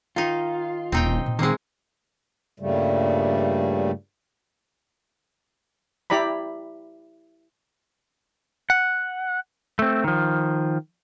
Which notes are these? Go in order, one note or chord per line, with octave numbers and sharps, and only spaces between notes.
D#3 D#4 F4
D#1 C4 C#4 D#4 G5
A#2
D#3 G#3 A#3 C4
G2 A#2 C#3 G3 A3
E4 G4 D5 A#5 B5
F#5
A3 C4
D#3 F3